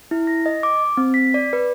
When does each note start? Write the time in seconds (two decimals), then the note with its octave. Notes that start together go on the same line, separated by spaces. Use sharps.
0.11 E4
0.27 A#6
0.46 D#5
0.63 D6
0.97 C4
1.14 B6
1.34 D5
1.53 B4